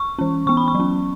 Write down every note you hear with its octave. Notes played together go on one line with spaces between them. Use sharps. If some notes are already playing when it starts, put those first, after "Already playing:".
Already playing: C#6
E3 C#4
E3 B3 C#6
B5
C#6
F#3 C#4